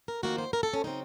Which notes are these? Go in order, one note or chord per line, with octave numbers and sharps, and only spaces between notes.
A#4
F2 D#3 A#3 F#4
C5
A#4
A4
C#4
C#3 F#3 C4 D#4